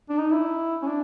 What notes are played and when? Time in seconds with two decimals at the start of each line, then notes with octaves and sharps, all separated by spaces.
0.10 D4
0.18 D#4
0.32 E4
0.82 C#4
0.88 D4